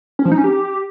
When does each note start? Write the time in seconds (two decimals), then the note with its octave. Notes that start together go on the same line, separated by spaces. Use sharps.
0.19 C#4
0.25 F3
0.32 D#4
0.38 C#4
0.44 G4